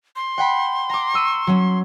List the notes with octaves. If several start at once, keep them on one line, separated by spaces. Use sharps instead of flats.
C6
F#5 G5 B5
A#5 D6
C#6 E6 D#7
F#3 C#4